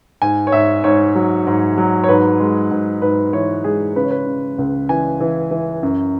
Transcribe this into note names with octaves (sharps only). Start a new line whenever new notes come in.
G#2 G#5
C#5
G#2 E5
G#2 C#5
F#3
G#2
F#3
C#5
G#2 B4
G#3
G#2
G#2 B4
E3 C#5
G#3 G#4
C#3 B4
C#5
B4
C#3
C#2
E3 G#5
E3
E3
F#2